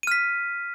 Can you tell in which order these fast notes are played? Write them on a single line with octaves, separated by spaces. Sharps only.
D#7 F6 B6